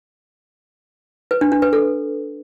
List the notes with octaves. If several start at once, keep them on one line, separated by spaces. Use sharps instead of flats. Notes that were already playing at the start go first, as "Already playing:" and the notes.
B4
D4
D4
B4
A4